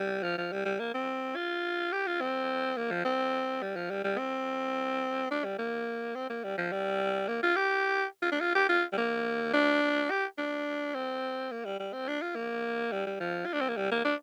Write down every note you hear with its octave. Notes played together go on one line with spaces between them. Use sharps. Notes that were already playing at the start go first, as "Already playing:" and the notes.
Already playing: G3
F3
F3
G3
G3
A#3
C4
F4
G4
F4
C4
A#3
F3
C4
G3
F3
G3
G3
C4
D4
G3
A#3
C4
A#3
G3
F3
G3
A#3
F4
G4
F4
D4
F4
G4
F4
G3
A#3
D4
G4
D4
C4
A#3
G3
G3
C4
D4
F4
A#3
G3
G3
F3
F4
D4
C4
A#3
G3
A#3
D4